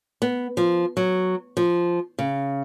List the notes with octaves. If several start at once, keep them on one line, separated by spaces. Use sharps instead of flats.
B3
F3
F#3
F3
C#3